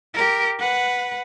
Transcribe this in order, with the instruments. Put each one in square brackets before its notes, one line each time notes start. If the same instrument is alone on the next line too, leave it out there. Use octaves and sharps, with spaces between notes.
[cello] G4 A#4
B4 F#5